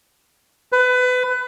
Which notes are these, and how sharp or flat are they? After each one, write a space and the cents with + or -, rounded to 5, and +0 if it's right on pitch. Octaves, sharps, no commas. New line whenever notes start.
B4 +25